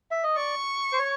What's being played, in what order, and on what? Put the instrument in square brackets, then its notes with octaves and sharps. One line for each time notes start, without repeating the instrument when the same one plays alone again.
[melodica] E5
D#5
[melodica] D5 [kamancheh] C#6
[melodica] C5
C#5